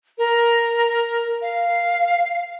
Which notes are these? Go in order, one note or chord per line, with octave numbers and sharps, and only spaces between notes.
A#4
F5